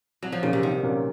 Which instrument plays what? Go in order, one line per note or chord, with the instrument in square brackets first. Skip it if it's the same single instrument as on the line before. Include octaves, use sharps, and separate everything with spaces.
[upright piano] C2 [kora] F#3
[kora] F3
[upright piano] A#2 F#3 A#3 C#4 [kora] C#3
[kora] C3
[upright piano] C2 [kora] D#3
[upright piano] A#2 F#3 A#3 C#4